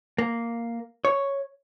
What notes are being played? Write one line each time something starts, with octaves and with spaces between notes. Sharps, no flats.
A#3
C#5